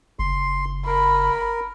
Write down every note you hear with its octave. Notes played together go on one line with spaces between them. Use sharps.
F#1 C6
A#4 B5